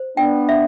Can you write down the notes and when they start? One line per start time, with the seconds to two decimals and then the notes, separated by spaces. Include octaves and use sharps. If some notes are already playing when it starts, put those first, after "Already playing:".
Already playing: C5
0.17 B3 D4 G5
0.49 E5